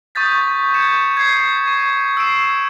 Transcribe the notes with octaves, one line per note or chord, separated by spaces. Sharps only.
C#6 D#6 G6 A6 B6
G6 G#6 C#7 E7
G#6 C7
C#6
E6 C7 D7 E7